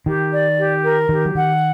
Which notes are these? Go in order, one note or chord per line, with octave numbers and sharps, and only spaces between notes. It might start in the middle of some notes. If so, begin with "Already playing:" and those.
D#3 G4
D5
G4
A#4
D#3 G4
F#3
D#3 F#5